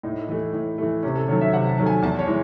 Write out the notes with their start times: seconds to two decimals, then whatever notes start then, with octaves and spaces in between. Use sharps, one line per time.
0.03 A2 D#4
0.28 E3 A3
0.53 A2
0.78 E3 A3
1.03 C3 C#4
1.16 A4
1.28 D#3 F#3 A3 C#5
1.41 E5
1.53 C3 F#5
1.69 A5
1.78 D#3 F#3 A3
1.87 G#5
2.02 E2 A5
2.19 C#5
2.27 E3 G#3